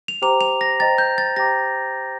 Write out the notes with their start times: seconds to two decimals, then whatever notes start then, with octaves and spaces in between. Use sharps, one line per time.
0.08 F7
0.22 G4 C5 G5 A#5 D6 F7
0.41 F7
0.61 A#6
0.79 C5 D#5 G5 A#5 A6
0.98 G6
1.18 A6
1.36 G4 C5 G5 A#5 D6 A#6